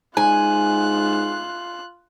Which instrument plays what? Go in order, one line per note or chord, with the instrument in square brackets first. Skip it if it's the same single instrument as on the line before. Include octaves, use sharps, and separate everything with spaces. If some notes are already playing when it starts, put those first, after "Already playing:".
[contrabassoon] G#2 [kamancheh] F4 F#6 [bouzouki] G#5